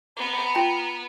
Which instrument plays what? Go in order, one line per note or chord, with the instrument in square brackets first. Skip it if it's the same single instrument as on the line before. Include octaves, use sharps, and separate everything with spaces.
[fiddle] B3 [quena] A#5
[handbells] F4 G5 A5